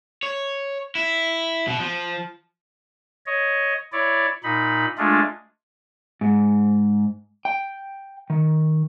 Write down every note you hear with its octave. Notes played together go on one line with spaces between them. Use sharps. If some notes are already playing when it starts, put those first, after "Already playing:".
C#5
E4
B2
F3
C#5 D#5
E4 C#5 D5
A#2 D#4 B5
G#3 A3 D4 F4
G#2
G5
D#3